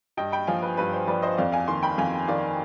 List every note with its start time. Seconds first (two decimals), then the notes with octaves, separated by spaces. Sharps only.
0.17 G2 D#5 G5
0.32 G5 B5
0.47 F3 F5 G#5
0.62 B4
0.77 G2 B4
0.93 C5
1.07 F3 B4 D5
1.22 C5 D#5
1.37 F2 D5 F5
1.52 F5 G#5
1.67 D#3 G#5 C6
1.83 G5 B5
1.98 F2 F5 G#5
2.28 D#3 D5 F5